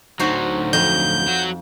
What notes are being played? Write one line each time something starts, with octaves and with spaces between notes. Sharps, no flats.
D2 F#3 D#4 F#4 C5
F2 D#5 G6
F#3 F#4